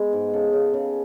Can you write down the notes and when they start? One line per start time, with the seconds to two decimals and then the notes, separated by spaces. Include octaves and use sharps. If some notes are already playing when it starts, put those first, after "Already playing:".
Already playing: G#3 B3
0.13 G#2
0.33 C#3 A4
0.53 C#3
0.74 C#3